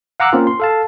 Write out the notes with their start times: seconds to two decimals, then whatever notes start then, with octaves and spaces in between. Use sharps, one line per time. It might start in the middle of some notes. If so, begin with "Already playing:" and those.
0.20 F5 F#5 A#5 D6 E6 F#6
0.33 A#3 C4 C#4 F4 A#4
0.47 C6
0.60 A4 F5 A5